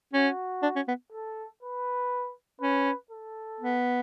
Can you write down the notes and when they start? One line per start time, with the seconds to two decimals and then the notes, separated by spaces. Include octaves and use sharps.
0.14 C#4 F#4
0.63 D4
0.76 C#4
0.88 B3
1.12 A4
1.63 B4
2.61 C#4 B4
3.11 A4
3.60 B3